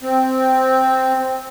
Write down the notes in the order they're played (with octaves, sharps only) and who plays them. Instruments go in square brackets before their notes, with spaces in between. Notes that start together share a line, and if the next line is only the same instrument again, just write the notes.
[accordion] C4